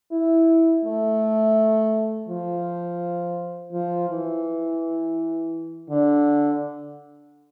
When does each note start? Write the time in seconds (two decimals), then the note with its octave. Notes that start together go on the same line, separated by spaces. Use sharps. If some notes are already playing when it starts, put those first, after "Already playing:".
0.12 E4
0.85 A3
2.28 F3
3.73 F3
4.09 E3
5.90 D3